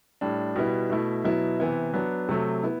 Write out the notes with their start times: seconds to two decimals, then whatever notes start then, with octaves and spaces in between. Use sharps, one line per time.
0.21 A2 G3 D4
0.56 B2 G3 B3 E4
0.90 B2 A3 E4
1.24 B2 F#3 B3 E4
1.60 C3 E3 B3 E4
1.93 F#3 B3 D4
2.29 C3 F#3 A3
2.63 B3 E4